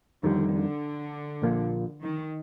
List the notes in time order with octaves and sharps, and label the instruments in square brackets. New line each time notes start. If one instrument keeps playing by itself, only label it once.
[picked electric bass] F2 D#3 G3 [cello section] D3
[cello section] D3
[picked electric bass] A#1 A#2 F3 A#3
[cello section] D#3